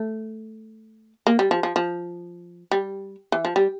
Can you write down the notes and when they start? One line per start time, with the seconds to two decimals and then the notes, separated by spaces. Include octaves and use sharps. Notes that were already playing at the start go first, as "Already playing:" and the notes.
Already playing: A3
1.27 A#3
1.39 G3
1.51 F3
1.63 F3
1.76 F3
2.71 G3
3.32 E3
3.45 F3
3.56 G3